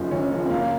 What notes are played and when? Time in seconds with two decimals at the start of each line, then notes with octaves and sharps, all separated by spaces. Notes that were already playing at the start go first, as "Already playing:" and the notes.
Already playing: F#1 F#2 F3 D#4
0.11 F#1 C#4
0.31 F#2 F3
0.45 C4
0.50 C#2 A#3